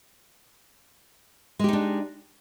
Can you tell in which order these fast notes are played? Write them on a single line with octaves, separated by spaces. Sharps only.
G#3 G4 D#4 D4